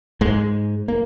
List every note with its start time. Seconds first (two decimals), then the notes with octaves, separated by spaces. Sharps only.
0.21 G#2 G#3
0.88 A#3